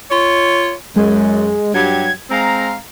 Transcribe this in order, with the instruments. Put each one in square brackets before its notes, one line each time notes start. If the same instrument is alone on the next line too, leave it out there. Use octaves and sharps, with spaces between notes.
[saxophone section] F4 C#5
[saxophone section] F#2 [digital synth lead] G#3
[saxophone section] G2 F#3 G4 [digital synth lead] G#6
[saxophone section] G#3 C4 F5 [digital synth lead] A#5